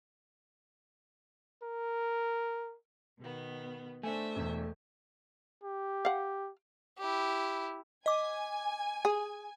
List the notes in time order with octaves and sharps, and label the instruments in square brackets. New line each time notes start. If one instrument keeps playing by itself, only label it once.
[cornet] A#4
[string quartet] B2 D#3 B3
[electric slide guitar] A3 [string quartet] D4 C5 E5 [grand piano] G#5
[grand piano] E1 E2
[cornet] G4
[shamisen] F5 F#5
[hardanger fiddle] E4 G4
[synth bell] D#5 D6 [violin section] G#5
[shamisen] G#4